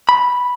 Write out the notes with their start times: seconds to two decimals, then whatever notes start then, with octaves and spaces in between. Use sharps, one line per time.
0.09 B5